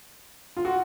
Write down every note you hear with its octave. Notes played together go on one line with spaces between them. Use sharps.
F4
F#4